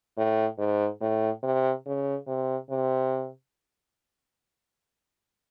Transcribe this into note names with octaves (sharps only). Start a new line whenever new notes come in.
A2
G#2
A2
C3
C#3
C3
C3